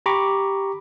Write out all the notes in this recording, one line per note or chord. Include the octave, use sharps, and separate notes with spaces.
G4 A#5 B5 C#6 D6